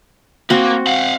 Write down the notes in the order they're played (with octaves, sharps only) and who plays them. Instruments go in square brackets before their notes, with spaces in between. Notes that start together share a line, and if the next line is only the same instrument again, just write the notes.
[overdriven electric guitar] A#3 [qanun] C4 F#4
[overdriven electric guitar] F5 F#5